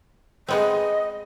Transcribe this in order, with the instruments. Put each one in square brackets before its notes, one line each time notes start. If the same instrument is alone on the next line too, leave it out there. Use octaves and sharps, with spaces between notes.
[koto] G#3 B3 C4 [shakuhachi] D#5